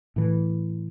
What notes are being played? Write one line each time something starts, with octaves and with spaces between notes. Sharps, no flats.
A2 E3